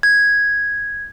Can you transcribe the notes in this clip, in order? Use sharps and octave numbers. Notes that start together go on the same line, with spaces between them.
G#6